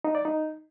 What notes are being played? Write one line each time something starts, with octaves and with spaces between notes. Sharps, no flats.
D#4
D5
D#4